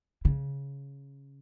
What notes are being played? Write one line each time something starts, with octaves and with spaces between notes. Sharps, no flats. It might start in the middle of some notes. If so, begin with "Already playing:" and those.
C#3